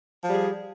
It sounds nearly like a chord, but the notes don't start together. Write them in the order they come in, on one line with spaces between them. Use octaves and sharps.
F3 G3 G#4